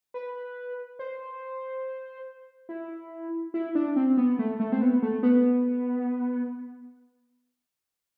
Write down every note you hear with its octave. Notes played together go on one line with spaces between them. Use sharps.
B4
C5
E4
E4
D4
C4
B3
A3
A3
C4
B3
A3
B3